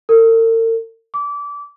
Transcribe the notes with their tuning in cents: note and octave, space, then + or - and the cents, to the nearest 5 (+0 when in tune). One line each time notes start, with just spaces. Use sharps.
A#4 -45
D6 -25